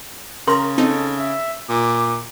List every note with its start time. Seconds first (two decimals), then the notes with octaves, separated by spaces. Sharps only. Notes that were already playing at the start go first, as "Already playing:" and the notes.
0.48 C#3 A#4 A#5 C6
0.78 C4 D#4 A4
1.19 E5
1.69 A#2 D6